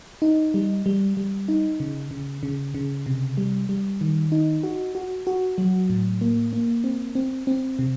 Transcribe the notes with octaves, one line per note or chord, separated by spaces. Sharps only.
D#4
G3
G3
G3
D#4
C#3
C#3
C#3
C#3
C3
G3
G3
D#3
D#4
F#4
F#4
F#4
F#3
A2
A#3
A#3
C4
C4
C4
C3